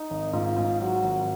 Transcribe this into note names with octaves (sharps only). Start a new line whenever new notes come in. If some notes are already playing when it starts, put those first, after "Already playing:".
Already playing: D#4
G#1
G#2 F4
G#2
F#3 F#4
G#1